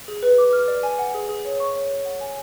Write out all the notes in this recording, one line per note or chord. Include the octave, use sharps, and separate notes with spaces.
G#4
B4
D6
F6
D5
G#5
F#5
G#4
G#4
C#5
C#6
C#5
C#5
F#5
G#5